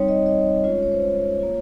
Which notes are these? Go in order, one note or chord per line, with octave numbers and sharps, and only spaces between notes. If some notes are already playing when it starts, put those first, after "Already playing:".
Already playing: G3 C4 D#4 C#5
D#5
D#5
G#3 C#4 F4 C#5
C#5
C5
C#5
A#3 F4